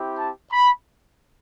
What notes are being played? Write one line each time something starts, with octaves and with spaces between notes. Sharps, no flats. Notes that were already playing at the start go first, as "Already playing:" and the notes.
Already playing: C4 E4 G4
A5
B5